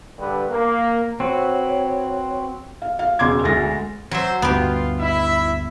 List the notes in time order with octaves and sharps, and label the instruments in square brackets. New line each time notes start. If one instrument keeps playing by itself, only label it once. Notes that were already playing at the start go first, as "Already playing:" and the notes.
[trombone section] G2 D3 G4 B4
A#3
[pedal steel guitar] C4 F#4 B4 [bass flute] C#5
[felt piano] F5
F5
E1 C#3 C6 D6 G#6
D2 G#3 A6 A#6
[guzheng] F#3 E5 [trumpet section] C5
[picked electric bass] D2 G2 [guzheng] B3 G4 [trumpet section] F4
[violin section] E4 [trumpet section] E5